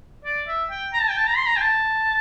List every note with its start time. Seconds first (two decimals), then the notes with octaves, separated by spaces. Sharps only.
0.25 D5
0.48 E5
0.70 G5
0.94 A#5
1.01 A5
1.10 G5
1.18 A5
1.27 A#5
1.36 C6
1.46 A#5
1.57 G5
1.61 A5